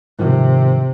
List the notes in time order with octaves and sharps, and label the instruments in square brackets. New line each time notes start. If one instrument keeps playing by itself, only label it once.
[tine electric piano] G#2 D#3 F3 [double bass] C3